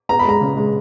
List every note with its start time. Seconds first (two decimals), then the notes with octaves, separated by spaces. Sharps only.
0.09 B3 A#5
0.19 B5
0.25 G#3 A#5
0.41 C#3
0.57 G#3